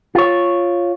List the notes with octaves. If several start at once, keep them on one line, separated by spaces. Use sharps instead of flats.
F4 C#5